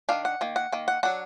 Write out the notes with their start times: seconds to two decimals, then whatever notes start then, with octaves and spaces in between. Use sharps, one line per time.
0.09 D#3 F#3 D4 F5
0.25 F#5
0.41 D#3 A#3
0.56 F#5
0.72 D#3 A#3
0.88 F#5
1.03 F#3 D4 F#5